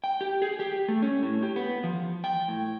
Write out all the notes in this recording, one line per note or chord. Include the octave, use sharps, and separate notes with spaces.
G5
G4
G#4
G4
A3
C#4
A2
G4
B3
F3
G5
A2